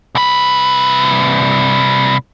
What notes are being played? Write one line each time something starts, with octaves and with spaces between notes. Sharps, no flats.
C2 B4